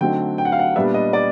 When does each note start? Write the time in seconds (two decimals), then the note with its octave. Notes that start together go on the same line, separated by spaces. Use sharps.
0.01 D3 F#3 A3 C4 D#4 G5
0.38 G5
0.45 F#5
0.52 F5
0.59 F#5
0.76 A#2 G3 B3 D4 E5
0.94 D#5
1.13 D5